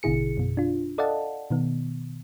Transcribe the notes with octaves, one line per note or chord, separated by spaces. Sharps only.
A1 B2 D3 E4 G#4 C#7
F#2 B2
D4 F4
A4 D5 D#5 F5 F#5 A5
B2 D#3 B3